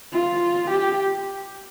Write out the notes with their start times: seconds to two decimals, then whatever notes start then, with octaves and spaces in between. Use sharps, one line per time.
0.13 F4
0.71 G4